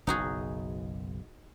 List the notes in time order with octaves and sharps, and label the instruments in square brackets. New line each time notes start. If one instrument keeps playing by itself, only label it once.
[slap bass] F#1 B1 [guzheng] D#4 F#4 G#4